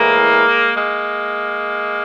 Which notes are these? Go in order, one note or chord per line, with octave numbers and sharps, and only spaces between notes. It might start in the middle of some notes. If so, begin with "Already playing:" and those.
Already playing: A2 E3 G#3 A#3
G#3 A#3